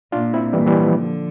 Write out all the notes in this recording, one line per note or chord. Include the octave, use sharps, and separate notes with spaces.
A#2 D4 F4
C4 E4
A#2 E3 G3
E3 G3
F3
D3